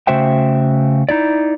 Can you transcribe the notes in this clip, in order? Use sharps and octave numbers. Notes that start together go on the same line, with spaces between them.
C#3 A3 F#4 C5 E5 G5
D#4 E4 D5